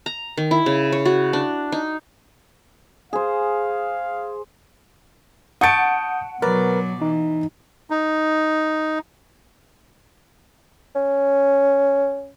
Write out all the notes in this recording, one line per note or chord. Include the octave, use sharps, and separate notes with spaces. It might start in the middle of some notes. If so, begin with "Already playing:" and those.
A#5
D#3
E4
C#3
C#5
F#4
D4
D#4
G#4 C5 F5
F#5 A5 C#6 D#6 G6 C#7 D7
B2 F#3 A#4 B4 D5
E3 D#4
D#4
C#4